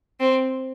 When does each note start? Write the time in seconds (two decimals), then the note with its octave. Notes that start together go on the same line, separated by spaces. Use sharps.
0.20 C4